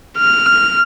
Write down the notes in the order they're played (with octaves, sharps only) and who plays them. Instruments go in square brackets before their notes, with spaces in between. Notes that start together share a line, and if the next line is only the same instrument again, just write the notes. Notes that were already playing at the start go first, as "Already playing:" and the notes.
[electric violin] F6